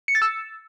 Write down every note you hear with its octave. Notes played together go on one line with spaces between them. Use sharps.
C#7
A6
E6